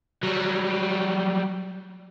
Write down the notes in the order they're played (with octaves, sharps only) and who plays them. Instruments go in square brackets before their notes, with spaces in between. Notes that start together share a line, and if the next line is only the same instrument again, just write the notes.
[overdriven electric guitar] F#3 G3